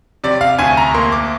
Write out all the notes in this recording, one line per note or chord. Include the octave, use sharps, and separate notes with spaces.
C3 D5
F5
D2 G#5
A#5
A#3 C6
D6